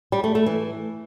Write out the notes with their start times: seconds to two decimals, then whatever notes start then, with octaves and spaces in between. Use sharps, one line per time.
0.12 G3
0.24 A3
0.35 A3
0.46 E3